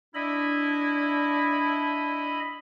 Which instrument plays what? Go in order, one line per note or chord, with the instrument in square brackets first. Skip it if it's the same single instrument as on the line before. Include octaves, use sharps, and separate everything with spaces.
[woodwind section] D4 E4 [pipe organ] D#5 B5